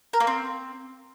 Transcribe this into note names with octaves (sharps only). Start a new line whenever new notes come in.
A#4
A#3
C4